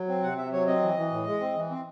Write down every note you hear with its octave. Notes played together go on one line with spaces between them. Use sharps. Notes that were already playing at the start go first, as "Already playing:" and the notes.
Already playing: F#3
C4
C3 F#5
C3 E5
F#3 C#5
C4 D#5
E3
E3
A2
G#3
C4
E3
C4